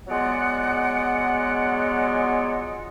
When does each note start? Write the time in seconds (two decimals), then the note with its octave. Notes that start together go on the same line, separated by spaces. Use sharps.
0.07 F#3 G#3 B3 F4 D5 F#5